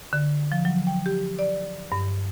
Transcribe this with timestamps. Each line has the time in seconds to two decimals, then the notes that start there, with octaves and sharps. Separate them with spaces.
0.13 D3
0.52 F3
0.65 F#3
0.87 G5
1.06 G4
1.39 D5
1.92 G2